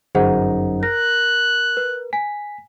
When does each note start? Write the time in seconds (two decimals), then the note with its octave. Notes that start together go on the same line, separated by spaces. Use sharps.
0.15 G1 F#2 D#4 G#4 C5 F#5
0.83 A#4 F#6 A#6
1.77 B4
2.13 G#5 B6